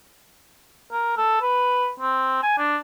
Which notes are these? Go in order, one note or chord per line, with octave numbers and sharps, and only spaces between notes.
A#4
A4
B4
C4
G#5
D4